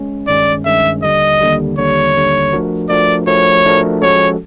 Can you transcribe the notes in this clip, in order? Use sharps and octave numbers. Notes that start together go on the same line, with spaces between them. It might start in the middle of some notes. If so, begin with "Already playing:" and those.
Already playing: G#3 C#4
G2 D#3 G#3 C#4 D5
G2 D#3 G#3 C#4 E5
D#2 D3 G3 D#5
D#2 D3 G3
D#2 D3 G3 C#5
D#2 D3 G3
F3 A3 D4 F#4 A#4
F3 A3 D4 F#4 A#4 D5
F3 A3 D4 F#4 A#4 C#5
F3 A3 D4 F#4 A#4
F3 G#3 C#4 F#4 A4 C#5